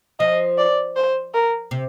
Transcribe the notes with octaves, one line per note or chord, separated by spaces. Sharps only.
F3 D#5
D5
C5
A#4
C3